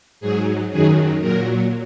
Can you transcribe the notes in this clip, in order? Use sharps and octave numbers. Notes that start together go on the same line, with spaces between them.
G#2 F#3 G#4
F#2 D#3 F#3 G#4
A#2 F#3 A#4